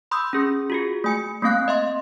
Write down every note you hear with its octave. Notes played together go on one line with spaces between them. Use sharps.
B5 C6 D#6 E6 G6
C#4 G#4
F4 F#4 G#4
A3 G#5 C#7
A3 A#3 C4 F5 F#6
D#5 E5 C6